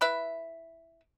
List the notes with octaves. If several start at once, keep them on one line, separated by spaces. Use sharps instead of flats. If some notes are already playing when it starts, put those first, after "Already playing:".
E4 B4 E5